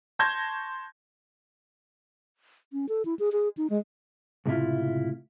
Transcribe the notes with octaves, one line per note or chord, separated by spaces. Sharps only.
A5 C6 C#6 G6 G#6 A#6
C#4
A4
E4
G#4
G#4
D#4
G#3
C#2 A2 C3 E4 F4